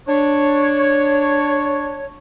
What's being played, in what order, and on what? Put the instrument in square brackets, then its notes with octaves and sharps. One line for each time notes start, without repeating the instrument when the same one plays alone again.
[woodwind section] D4 C#5